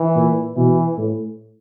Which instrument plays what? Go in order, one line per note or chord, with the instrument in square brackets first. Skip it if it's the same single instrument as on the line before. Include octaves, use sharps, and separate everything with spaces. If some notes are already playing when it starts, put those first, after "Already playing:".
Already playing: [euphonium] E3
[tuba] A#2
[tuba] B2 [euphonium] E3
[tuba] A2